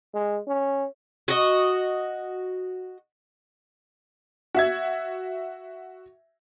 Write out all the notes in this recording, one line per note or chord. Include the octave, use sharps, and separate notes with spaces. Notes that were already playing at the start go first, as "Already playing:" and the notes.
G#3
C#4
F#4 D#5
F#4 E5 G#6